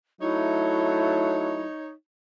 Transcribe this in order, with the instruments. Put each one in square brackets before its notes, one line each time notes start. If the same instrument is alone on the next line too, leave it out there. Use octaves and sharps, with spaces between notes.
[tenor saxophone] F#3 [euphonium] A3 [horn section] D#4 C#5 [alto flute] E4